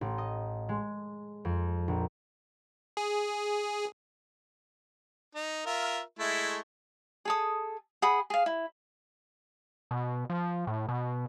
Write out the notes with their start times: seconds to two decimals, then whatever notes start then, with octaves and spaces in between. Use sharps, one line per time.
0.01 A1
0.18 D#5
0.69 G#3
1.45 F2
1.88 A#1
2.97 G#4
5.35 D#4
5.66 F4 A#4 E5
6.19 G#3 A3 E4
7.25 G#4 A4 D#6
8.02 G#4 F#5 B5 D#6
8.30 G#4 F5
8.46 E4
9.91 B2
10.30 F3
10.67 A2
10.89 B2